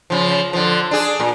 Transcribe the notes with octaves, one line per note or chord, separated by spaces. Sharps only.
C#3 F3
D3 F3
D4 G#4
A#2